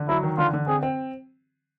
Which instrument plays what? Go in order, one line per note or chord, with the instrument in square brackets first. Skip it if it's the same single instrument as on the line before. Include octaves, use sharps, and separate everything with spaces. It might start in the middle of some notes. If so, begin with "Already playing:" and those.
Already playing: [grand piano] D3
[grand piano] F#3 [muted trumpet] E4
[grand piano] D#3
[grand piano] D3 [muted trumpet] F4
[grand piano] D3
[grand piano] C4 [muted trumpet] G#4
[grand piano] C4